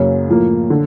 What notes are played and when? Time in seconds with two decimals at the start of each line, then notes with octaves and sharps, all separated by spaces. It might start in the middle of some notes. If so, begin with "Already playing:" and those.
Already playing: F#2 C#3 F#3 A#3 C#4
0.28 A2 F3 A#3
0.70 D3